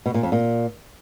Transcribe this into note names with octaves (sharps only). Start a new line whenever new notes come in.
B2
A#2
F2
A#2